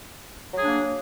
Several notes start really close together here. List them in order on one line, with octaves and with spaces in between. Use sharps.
F#3 G#4 D4 A#3